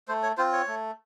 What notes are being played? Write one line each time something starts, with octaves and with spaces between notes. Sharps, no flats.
A3 C5
C#5
C4 F4 C5
C#5
A3